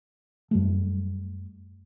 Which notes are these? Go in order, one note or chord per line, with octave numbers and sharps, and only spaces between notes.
F#2 G3 A3